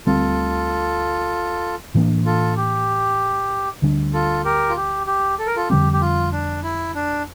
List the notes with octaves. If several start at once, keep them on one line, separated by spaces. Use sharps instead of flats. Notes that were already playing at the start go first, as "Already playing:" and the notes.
D2 D3 G3 C4 F4 A4
A2 E3 A#3 D4
F4 A4
G4
D2 D3 G3 D4
F4 A4
G4 A#4
F4
G4
G4
A4
A#4
F4 A4
F2 D3 G3 C4 G4
G4
F4
D4
E4
D4